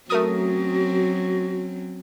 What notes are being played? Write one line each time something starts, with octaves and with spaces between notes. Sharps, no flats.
F#3 A3 C4 C#4 F#4 A#4 D#6